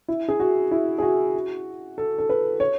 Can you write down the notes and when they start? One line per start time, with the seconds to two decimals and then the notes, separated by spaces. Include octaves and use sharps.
0.08 E4
0.28 G#4
0.40 F#4
0.71 E4
0.98 G#4
1.02 F#4
1.98 A4
2.18 A4
2.29 B4
2.60 C#5